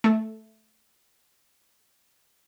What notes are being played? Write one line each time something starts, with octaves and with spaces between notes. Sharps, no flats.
A3 A4